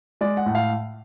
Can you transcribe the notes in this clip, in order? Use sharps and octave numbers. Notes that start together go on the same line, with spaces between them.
G#3 D5
F#5
A2
F5